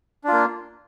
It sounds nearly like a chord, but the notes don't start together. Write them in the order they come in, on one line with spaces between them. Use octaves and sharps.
D4 F4 A#3